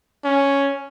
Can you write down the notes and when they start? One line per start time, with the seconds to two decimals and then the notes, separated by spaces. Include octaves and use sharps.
0.25 C#4